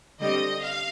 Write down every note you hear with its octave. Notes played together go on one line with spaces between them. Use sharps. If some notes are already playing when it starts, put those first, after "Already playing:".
D3 G3 C4 D#5
F5